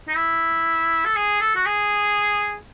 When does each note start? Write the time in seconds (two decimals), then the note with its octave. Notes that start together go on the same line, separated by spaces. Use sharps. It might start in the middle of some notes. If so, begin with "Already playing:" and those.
0.08 D#4
0.16 E4
1.05 A4
1.17 G#4
1.41 A4
1.56 F#4
1.66 G#4